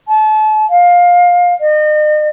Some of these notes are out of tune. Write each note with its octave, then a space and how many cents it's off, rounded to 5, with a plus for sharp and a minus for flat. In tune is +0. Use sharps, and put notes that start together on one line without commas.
A5 -35
F5 +20
D#5 -40